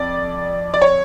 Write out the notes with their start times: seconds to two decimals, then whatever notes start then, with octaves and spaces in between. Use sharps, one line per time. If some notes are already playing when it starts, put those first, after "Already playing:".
Already playing: F2 D5
0.74 D5
0.82 C#5